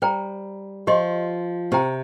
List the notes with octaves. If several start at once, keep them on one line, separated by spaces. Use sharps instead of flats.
G3 C5 G5 A#5
F3 G4 D#5 C6
C3 G4 C5 G5 A#5